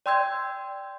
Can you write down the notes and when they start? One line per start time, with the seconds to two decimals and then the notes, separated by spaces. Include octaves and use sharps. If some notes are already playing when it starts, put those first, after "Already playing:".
0.06 D5 G5 C6 E6 G6 G#6